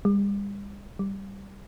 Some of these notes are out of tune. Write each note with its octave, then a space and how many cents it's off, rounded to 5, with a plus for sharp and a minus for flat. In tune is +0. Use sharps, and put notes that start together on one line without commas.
G3 +40
G3 -5